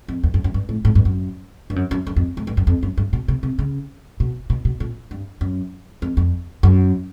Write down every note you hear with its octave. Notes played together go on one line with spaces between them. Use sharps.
F2
E2
F#2
F#2
G2
A2
A2
G2
F#2
G2
F#2
F#2
F#2
F2
G#2
G2
F#2
F2
F#2
G2
B2
C3
C3
C#3
B2
B2
B2
A#2
G2
F#2
F2
F2
F#2